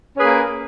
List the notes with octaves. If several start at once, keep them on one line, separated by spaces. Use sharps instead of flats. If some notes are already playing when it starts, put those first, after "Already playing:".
A#3 C#4 G#4 A#4 B4